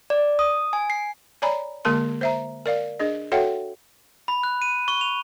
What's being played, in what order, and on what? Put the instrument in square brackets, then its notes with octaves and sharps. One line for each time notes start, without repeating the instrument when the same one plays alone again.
[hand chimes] D5
D#6
G#5
C7
[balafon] C#5 D5 G#5 A#5 B5
D3 G#3 A#3 A#4 A5 C6
C5 E5 A#5
A#4 D5 F5
D4 G#4 D#5
F#4 A4 C#5 E5 F#5 G5
[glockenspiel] B5
F#6
D#7
C#6
F7